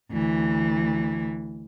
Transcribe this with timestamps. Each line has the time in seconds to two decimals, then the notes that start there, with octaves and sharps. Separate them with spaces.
0.11 D2 E3